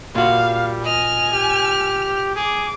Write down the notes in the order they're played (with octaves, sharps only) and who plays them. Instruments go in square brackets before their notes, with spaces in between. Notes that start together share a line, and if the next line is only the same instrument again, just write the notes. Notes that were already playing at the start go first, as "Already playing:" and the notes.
[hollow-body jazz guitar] A#2 F#4 [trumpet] G3 [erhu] F5
[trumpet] D#5 [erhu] G#5 [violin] F6
[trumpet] G4
[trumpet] G#4 [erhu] D6